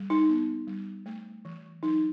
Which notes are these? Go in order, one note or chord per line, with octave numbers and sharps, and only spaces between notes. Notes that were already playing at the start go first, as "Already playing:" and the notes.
Already playing: G3
D#4
B3
G3
A3
E3
F#3 D#4